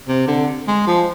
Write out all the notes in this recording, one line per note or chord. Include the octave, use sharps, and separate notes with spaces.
C3
D3
G#3
F3